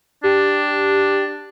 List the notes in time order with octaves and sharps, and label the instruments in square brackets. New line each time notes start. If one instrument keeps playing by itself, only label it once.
[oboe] D4 [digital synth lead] G4